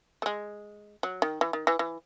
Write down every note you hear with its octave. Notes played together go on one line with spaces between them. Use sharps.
A3
G#3
F#3
D#3
E3
D#3
E3
E3